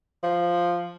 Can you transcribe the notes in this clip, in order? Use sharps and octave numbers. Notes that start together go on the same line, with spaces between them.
F3